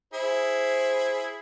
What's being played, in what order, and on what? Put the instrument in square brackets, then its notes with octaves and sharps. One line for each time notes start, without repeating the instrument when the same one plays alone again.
[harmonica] E4 G#4 [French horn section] C5